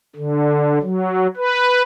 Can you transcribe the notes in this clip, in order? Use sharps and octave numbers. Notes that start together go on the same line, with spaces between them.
D3
F#3
B4